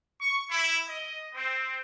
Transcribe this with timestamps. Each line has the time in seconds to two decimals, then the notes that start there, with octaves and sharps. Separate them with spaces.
0.20 C#6
0.50 E4
0.86 D#5
1.34 C4